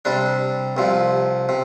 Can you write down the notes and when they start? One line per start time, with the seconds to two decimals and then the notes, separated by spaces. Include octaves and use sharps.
0.05 C3 G3 D4
0.77 C2 C3 F3
1.49 C3